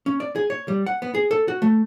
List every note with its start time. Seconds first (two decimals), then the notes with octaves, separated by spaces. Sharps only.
0.06 C#4
0.20 D5
0.36 G#4
0.50 C#5
0.68 G3
0.86 F#5
1.02 B3
1.15 G#4
1.31 A4
1.48 F#4
1.62 A3